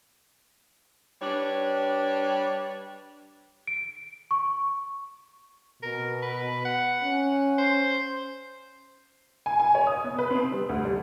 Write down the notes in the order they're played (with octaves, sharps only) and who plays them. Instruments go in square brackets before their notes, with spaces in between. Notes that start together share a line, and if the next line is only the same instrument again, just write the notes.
[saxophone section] G3 D4 B4 C#5
[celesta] D7
C#6
[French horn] B2 [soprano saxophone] A#4
[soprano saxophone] B4
F#5
[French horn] C#4
[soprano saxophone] C5
[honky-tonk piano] G#5
G#5
C#5
D#6
B3
B4
C4
G3
D2
G3